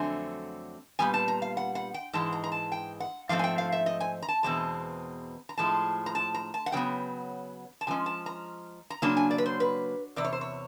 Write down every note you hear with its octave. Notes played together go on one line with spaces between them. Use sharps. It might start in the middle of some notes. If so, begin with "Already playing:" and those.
Already playing: F2 D3 F#3 A3 C4 G#5
A#2 G3 B3 G#5
A5
A#5
F5
F#5
F#5
G5
G#2 E3 G#3 A5
A#5
A#5
A5
G5
F#5
G#2 F3 A3 C4 F5
G#5
G5
F5
E5
D#5
G#5
A#5
A5
E2 B2 G#3 C4 A5
A#5
A2 F3 G#3 A5
A#5
A5
A#5
A5
F#5
C#3 F#3 B3 G5
A5
C#3 F3 G#3 C#4 G#5
A5
A#5
A#5
C#3 F#3 A#3 D4 A5
G#5
D5
B4
C5
B4
E2 C3 D5
C#5
C5
C#5